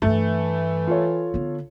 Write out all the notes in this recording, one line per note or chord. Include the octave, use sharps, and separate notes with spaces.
G2 E3 A3 D4
F4 A4 C#5
D3 B3